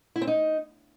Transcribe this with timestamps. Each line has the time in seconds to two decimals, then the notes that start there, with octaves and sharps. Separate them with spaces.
0.16 E4
0.22 C4
0.27 D#4